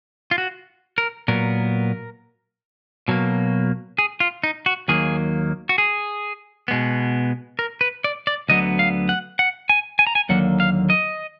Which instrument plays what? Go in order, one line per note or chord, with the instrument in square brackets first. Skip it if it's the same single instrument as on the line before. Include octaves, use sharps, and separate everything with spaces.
[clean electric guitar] F4
F#4
A#4
A#2 F#3 B3 A#4
B2 F#3 A#3
G#4
F4
D#4
F#4
D#2 D#3 F#3 A#3 G#4
F#4
G#4
B2 G#3 B3
A#4
B4
D5
D5
D2 D3 F#3 B3 D#5
F5
F#5
F#5
G#5
G#5
A#5
G#5
D#2 D3 F#3 A#3 F#5
F5
D#5